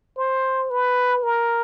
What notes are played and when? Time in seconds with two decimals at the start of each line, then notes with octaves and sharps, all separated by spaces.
0.17 C5
0.70 B4
1.23 A#4